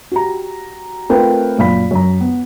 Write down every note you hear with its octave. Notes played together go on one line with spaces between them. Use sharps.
F#4 G4 A#5
A3 C4 F4 A#4 B4 G5
F#2 A#2 F5 B5 B6
F#2 A#5
B3